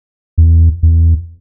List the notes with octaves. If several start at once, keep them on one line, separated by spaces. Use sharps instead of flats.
E2
E2